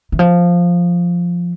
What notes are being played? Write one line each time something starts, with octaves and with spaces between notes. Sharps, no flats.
E3
F3